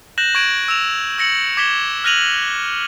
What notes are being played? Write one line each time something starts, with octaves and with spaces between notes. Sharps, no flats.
F#6 G6 A#6 E7 F#7
C#6 G#6 D7 F#7
E6 E7 F7
E6 A#6 C#7 F#7
D6 G#6 B6 E7 G7
F6 F#6 A#6 D#7 F7 F#7